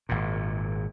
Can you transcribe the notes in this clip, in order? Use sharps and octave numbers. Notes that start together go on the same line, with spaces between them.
G#1 A#2